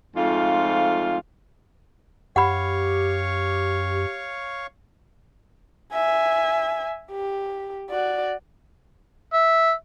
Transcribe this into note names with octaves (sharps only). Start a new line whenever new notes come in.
F2 G#2 A3 F4 F5
F#2 G4 C#5 F5 F#5 B5 C#6
E5 G#5
G4
F#4 D5
E5